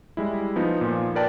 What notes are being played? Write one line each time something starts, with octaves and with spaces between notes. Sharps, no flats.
G3 G#3 E4
F3 B3 D#4
A#2 F3
A#4 B4 D5 G5 A5